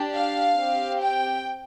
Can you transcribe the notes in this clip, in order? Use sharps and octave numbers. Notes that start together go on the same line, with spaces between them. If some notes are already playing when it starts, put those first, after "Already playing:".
Already playing: D4 G4
F5
C4 G4
G5